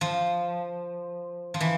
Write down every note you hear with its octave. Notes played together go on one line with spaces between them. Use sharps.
F3
F3
E3